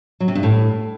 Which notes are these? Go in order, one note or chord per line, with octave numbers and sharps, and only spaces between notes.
F#3
C3
G2
A2